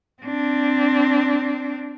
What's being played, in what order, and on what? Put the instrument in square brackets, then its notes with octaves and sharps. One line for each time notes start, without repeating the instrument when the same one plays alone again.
[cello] C4 D4